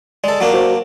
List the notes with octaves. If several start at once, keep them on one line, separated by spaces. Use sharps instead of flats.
G#3 A4 D5
F#3 A#3 D4
F#4 C5